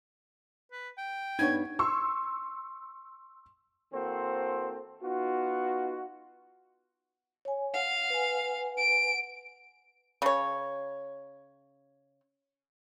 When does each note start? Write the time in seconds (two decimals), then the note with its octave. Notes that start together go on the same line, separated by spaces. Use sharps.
0.72 B4
0.98 G5
1.39 G2 B3 D#4 C#5 G#6
1.79 C6 C#6 E6
3.93 E3 A#3 C4 F#4 A4 C5
5.02 B3 D#4 F4 F#4
7.45 C#5 G#5
7.74 F5 F#5
8.10 B4 F#5 G#5
8.77 D7
10.22 C#3 C#5